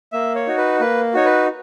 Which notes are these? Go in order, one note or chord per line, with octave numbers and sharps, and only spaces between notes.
A#3 E5
C#5
D#4 F#4
B4
A#3 B4
D#4 F#4 C#5
B4